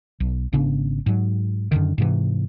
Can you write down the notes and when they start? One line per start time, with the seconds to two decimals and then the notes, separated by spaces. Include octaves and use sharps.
0.20 B1
0.53 G#1 C#3 B3 D4
1.06 G#2 F#3
1.72 F#2 A2 D3 D#3
1.98 G#2 C3 E3